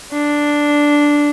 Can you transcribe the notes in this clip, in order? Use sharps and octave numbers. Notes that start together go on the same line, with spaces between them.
D4